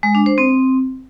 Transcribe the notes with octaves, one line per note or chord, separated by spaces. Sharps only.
G#3
D4
C5
C4